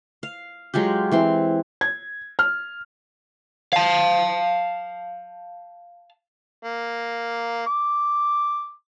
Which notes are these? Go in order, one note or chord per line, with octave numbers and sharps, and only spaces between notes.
F5
F#3 G#3 F4 G4
E3 C4 C6
G#6
F6
F5 A5
A#3
D6